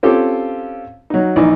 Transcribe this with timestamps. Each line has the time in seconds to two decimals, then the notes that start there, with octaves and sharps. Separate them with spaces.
0.03 C4 C#4 F4 G4 A4
1.10 F#3 D#4
1.36 A#1 E3 D#4